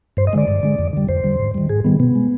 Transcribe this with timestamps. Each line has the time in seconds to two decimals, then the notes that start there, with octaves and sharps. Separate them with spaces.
0.17 G2 C5
0.27 D#5
0.33 D3 G#3 D5
0.48 G2
0.63 D3 G#3
0.79 F2
0.93 D3 G3
1.09 F2 C5
1.24 D3 G3
1.39 G#2
1.54 D#3 G3
1.69 G#2 G#4
1.84 D#3 G3 B3
2.00 B2 B3
2.15 G#3